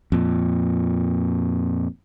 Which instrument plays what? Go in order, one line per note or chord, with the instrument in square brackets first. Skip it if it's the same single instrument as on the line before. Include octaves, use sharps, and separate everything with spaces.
[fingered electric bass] F2 A#2